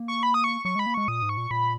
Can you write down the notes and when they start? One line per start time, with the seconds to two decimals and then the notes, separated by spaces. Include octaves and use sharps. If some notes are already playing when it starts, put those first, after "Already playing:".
Already playing: A#3
0.08 C#6
0.23 B5
0.34 D#6
0.44 C#6
0.65 F#3 C#6
0.75 G#3 B5
0.86 A#3
0.94 G#3 C#6
1.08 A#2 D#6
1.22 G#2
1.29 C#6
1.37 A#2
1.51 A#2 B5